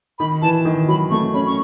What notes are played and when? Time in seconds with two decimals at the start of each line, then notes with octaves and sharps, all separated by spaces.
0.19 D#3 B5
0.42 E3 A5
0.65 D#3
0.88 F#3 B5
1.10 A3 C#6
1.34 C#4 B5
1.46 C#6